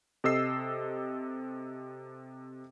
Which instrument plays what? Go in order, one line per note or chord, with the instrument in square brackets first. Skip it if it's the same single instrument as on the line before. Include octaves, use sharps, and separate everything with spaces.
[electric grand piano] C3 A4 D#5 E6 C7